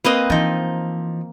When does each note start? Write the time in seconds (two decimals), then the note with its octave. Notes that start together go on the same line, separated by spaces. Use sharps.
0.05 A#3 C4 B4 D#5
0.30 E3 F3 D#4